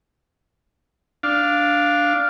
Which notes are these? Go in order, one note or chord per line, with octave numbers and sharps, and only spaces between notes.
D4 F5